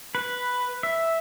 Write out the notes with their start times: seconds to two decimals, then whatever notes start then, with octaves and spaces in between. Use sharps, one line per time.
0.15 B4
0.83 E5